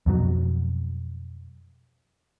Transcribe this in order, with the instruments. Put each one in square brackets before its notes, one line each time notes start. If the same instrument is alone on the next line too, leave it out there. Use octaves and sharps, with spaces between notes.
[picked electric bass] F2 B2 F#3